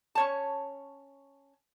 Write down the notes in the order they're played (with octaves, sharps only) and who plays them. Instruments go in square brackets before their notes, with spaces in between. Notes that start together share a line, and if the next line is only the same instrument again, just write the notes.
[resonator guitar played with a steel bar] C#4 C#5 A5